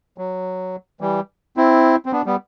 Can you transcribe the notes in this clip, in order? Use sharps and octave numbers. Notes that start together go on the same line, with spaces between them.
F#3
E3 G3
C4 E4
C4
B3 D4
G3 B3